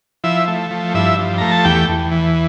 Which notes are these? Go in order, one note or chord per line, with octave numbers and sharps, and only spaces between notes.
F3 E4 E5
A3
F3
G2 E4 E5
F3
A3 A#5
A5
E2 G4 G5
E2
E3